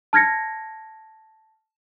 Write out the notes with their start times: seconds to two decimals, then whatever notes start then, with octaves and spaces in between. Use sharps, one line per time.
0.13 A5 F6 G#6 A#6 C#7